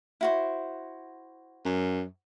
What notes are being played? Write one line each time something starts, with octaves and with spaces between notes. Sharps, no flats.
E4 F#4 C5
F#2